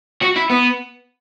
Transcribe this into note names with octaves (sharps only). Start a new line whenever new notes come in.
F#4
E4
B3